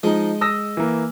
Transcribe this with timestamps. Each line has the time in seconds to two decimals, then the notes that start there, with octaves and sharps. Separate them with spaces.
0.03 F3 G#3 D#4
0.41 D#6 E6 A#6
0.77 E3 A#3